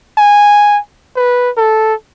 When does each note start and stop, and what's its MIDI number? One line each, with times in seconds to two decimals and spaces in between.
0.18 0.78 80
1.16 1.50 71
1.57 1.94 69